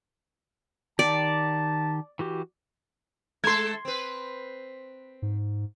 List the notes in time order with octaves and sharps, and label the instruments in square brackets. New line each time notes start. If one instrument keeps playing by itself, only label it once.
[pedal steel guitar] D#3 G4 [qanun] D5 [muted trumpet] A5
[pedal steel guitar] E3 F#4 G4
[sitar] G#3 A4 [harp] C6 G#6
[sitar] C4 B4
[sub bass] G#2